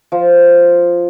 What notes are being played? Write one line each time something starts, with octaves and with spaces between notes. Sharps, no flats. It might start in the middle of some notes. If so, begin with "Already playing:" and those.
F3